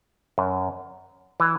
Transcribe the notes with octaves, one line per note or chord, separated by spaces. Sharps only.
F#2
E3